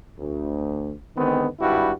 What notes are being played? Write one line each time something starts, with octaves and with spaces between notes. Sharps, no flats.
D2
D3 D#3 G#3 B3 C4
G#1 G2 G3 E4 F#4